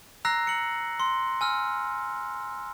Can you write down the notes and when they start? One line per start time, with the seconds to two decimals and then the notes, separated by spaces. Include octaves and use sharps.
0.25 A#5 E6 F#6 A#6 C7
0.47 C#7 F#7
1.00 C6
1.41 G#5 E6 F6